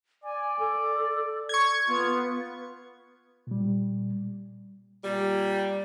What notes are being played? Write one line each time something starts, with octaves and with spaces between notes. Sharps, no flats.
D5 G#5
A4
C#6 G#6
B3 F4
A#2 G3
A#2 G3